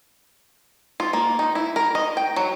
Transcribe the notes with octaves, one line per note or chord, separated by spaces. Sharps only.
F4
A#3
D#4
E4
A#4
D#5
G5
F#3